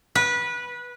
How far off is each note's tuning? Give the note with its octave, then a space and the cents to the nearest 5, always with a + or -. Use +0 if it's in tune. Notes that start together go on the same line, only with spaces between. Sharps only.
B4 -20